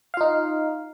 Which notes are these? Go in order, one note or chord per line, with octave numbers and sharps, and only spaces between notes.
D#4 F4 F5